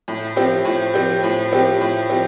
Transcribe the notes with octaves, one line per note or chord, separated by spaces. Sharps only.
A2
F3 C4 G4
A2
F3 C4 G4
A2
F3 C4 G4
A2
F3 C4 G4